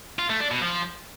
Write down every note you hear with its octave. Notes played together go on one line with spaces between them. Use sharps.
F4
A3
D4
B2
F3